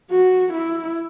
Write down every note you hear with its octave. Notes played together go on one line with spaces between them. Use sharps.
F#4
E4